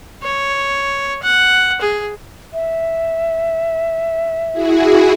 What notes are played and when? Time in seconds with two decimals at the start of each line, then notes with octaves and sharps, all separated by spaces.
0.22 C#5
1.22 F#5
1.81 G#4
2.53 E5
4.53 E4 F#4 G#4